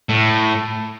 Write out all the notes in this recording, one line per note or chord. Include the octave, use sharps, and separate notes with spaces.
A2